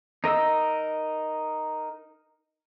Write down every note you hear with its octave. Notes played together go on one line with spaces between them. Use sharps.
D#4 A#4 D#5 E6